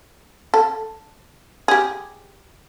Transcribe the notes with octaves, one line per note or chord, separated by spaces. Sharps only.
A4
G4 G#4